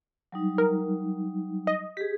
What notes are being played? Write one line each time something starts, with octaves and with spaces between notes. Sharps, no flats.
F#3 G3 D#4
A#4
D#5
G4 G#4 B6